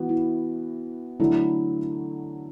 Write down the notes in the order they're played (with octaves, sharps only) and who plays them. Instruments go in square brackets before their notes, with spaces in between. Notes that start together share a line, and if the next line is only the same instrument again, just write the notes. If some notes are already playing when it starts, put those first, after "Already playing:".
Already playing: [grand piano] E3 B3 F#4
[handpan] E4
[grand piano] D3 F#3 A3 [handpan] E4